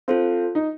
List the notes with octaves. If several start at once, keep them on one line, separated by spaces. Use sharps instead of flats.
C4 F4 A4 C5 F5
D#4